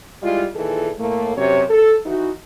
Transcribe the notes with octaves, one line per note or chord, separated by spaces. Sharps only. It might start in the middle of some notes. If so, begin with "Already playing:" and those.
G3 G#3 E4 F4
A#2 D#3 E3 F4 G#4 A4
A2 A3 A#3
F#2 C3 C#5
A4
E3 D#4 F#4